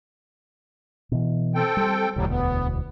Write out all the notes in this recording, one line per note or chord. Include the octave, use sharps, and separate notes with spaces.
B2 E3
C4 A4 G5
G3
E1 D2 A2 F#3 G3
B3